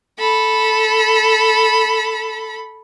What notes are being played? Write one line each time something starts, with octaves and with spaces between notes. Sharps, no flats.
A4 B5